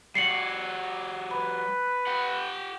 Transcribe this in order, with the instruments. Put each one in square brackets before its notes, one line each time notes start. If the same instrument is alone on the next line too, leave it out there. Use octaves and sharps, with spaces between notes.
[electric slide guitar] G3 F#4 [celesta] C7 C#7 F#7
[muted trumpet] B4 [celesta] B5
[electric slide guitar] G4 F#5